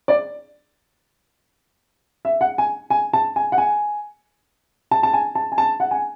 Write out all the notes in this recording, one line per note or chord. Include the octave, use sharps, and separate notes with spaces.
D5
E5
F#5
G#5
G#5
A5
G#5
F#5
G#5
A5
A5
G#5
A5
G#5
A5
F#5
G#5